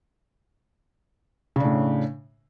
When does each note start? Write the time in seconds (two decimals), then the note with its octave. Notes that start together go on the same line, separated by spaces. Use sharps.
1.56 C#3
1.60 D4
1.64 A2